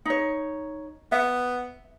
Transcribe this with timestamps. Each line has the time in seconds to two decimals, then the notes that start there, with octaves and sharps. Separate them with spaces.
0.05 D#4 C#5
1.12 B3 E5